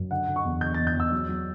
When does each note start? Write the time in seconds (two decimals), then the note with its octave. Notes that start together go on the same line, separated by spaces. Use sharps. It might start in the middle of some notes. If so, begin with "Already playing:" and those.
Already playing: F#2
0.11 D3 F#5
0.28 D3
0.36 C#6
0.45 E2
0.61 D3 G6
0.74 E2 A6
0.87 G6
0.95 E2 E6
1.12 F#3
1.29 F#3